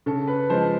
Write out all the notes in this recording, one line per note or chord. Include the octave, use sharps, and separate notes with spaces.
C#3 A4
B4
F3 G#3 C5